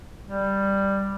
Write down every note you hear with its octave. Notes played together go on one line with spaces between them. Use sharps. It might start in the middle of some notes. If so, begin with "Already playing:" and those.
G3